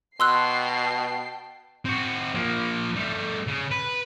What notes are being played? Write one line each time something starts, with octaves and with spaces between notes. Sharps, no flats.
B2 G5 A5 C6 E6 F#6 C7
C4 F#4
F3 A#3
G3 A3
C#3
B4